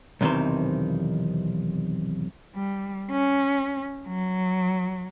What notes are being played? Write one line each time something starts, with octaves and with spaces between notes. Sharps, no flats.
B1 E2 C3 D#3 E3 C5
G3
C#4
F#3